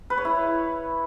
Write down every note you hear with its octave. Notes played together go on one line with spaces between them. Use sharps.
B4
C#5
E4